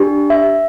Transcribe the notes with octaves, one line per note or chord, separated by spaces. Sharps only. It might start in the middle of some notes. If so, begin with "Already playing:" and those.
Already playing: D4 G4
E5